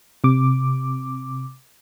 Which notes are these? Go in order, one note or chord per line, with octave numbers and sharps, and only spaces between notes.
C3 D6